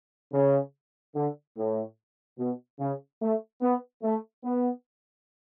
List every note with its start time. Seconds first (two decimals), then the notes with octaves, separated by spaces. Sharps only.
0.32 C#3
1.14 D3
1.56 A2
2.38 B2
2.79 C#3
3.21 A3
3.61 B3
4.03 A3
4.44 B3